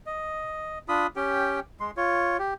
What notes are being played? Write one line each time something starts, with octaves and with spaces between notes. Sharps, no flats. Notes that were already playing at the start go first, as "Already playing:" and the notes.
D#5
D4 F4 B5 D#6
C#4 G4 G5
G#3 C6
F4 C#5
G4